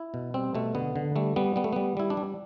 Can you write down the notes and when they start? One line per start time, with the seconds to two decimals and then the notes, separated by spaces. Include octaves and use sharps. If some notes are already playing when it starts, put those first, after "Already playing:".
Already playing: E4
0.14 B2
0.34 G3 C4
0.55 B2 A3
0.75 D3 B3
0.96 D3
1.16 G3 A3
1.36 G3 B3
1.56 G3 B3
1.64 A3
1.73 G3 B3
1.97 G3 E4
2.10 D4
2.17 G3